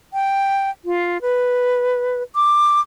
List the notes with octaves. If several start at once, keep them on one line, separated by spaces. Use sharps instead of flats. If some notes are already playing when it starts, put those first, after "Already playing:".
G5
F4
B4
D6